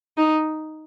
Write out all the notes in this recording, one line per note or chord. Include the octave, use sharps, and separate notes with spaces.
D#4